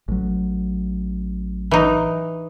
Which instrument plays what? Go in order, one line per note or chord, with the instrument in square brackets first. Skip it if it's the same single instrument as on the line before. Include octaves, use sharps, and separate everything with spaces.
[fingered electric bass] A1 F#3
[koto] E3 D#4